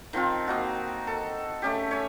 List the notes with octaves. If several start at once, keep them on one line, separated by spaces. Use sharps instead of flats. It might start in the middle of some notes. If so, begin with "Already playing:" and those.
D#3 F3 C4 F4
A#3 D#4 F#4
A4
A3 C#4 G4
C#5 G#5